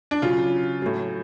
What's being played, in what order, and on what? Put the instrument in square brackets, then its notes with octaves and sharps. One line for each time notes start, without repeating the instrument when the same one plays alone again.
[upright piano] D4
C#3 F#3 F4
A2 F#3